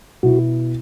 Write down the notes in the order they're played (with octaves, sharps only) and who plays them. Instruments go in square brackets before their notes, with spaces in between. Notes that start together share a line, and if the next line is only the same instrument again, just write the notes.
[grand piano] B2 B3 E4 [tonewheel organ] F#4